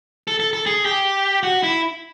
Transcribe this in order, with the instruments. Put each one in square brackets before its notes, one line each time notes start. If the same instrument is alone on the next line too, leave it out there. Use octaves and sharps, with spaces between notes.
[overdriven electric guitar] A4
A4
A4
G#4
G4
F#4
E4